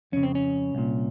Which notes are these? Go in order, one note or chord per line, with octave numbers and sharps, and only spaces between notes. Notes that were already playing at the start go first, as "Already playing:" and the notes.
F2 C#3 C#4
C4
C#4
C2 A#2